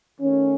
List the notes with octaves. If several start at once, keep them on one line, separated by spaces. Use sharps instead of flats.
D#3 A3 C#4